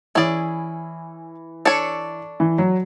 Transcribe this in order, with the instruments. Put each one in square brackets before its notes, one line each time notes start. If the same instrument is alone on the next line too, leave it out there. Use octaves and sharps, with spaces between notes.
[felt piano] E3 [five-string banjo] C#4 E4 G#4 D5
[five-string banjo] D4 A4 C#5
[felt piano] E3
F#3